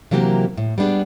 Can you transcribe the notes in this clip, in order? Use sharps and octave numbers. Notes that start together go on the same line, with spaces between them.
C3 E3 F#3 A#3 G4 A#4
A2
G3 B3 D4 G#4